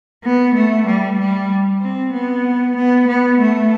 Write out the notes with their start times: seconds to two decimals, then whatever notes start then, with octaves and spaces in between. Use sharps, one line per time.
0.24 B3
0.54 A3
0.86 G3
1.19 G3
1.81 C4
2.13 B3
2.76 B3
3.08 B3
3.39 A3